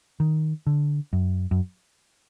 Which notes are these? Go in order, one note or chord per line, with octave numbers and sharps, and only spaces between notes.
D#3
D3
F#2
F#2